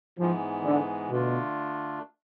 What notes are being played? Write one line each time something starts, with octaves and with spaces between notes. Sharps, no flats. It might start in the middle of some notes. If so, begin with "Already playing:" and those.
G#2 E3 F3 G#3 B3
D3
B2 D3 A3 D4 F4